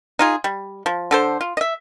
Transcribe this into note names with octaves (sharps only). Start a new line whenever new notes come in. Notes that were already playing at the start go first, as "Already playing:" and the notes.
D#4 F4 G#4
G3
F3
D3 A4 C5
F4
D#5 E5